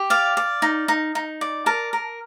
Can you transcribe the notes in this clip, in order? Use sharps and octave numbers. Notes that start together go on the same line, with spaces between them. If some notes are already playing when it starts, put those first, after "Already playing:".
Already playing: G4
D5 F5
D5
D#4
D#4
D#4
D5
A#4 A5
A#4